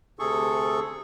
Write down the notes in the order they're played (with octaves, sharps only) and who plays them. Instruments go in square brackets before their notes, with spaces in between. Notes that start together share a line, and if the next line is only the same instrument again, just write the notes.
[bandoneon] D2 C3 G#4 A4 C#6